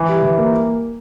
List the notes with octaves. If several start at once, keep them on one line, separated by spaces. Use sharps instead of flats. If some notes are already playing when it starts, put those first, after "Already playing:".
Already playing: E3
G3
E3
A#3